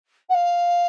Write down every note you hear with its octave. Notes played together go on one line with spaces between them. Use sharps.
F#5
F5